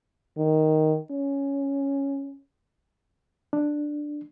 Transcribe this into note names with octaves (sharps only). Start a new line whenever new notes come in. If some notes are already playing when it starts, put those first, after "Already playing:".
D#3
C#4
D4